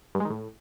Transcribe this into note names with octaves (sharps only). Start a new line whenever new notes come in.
G2
G#3
D#3
A2